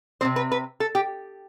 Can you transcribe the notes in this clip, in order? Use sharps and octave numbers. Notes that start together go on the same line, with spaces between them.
C3 F3 C4 C5
B4
B4
A4
G4